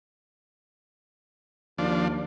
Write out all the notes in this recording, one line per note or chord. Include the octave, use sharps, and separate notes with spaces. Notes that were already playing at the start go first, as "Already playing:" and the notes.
D#2 F3 D4